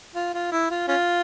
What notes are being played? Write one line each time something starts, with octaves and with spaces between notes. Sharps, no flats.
F4
F4
E4
F4
C#4 F4